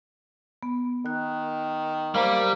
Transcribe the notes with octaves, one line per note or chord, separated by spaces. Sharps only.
B3
D#3 F#6
G3 A#3 C5 F5